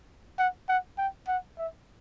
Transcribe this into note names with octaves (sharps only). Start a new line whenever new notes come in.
F#5
F#5
G5
F#5
E5